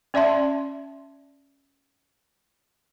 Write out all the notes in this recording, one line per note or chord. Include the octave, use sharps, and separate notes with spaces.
C#4 D5 E5 A5 C6